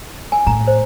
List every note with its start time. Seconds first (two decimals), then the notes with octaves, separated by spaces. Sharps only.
0.32 G#5
0.47 A2 A#5
0.67 C5